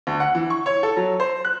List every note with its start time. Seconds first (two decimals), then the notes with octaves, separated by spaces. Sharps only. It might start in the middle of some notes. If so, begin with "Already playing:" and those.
0.07 D2
0.20 F#5
0.35 E3
0.50 C#6
0.66 C#5
0.83 A4
0.96 F#3
1.20 C5
1.45 F#6